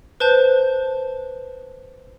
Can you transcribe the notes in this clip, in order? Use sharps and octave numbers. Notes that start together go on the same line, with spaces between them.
B4 C5 A5 G6